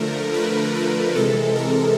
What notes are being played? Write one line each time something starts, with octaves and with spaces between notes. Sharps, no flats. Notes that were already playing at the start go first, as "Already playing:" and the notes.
Already playing: D3 F3 A3 A#4
B4
A#4
C3 E3 G#3 A4
A#4